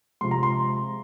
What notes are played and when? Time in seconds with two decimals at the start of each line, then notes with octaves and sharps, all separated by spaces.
0.21 C3 F3 G#3 C6
0.31 A#5
0.43 C6